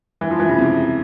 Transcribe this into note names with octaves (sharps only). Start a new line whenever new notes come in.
E3
F3
E3
C#3
C3